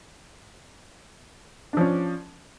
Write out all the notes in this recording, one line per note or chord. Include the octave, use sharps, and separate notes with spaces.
F3 C#4 D4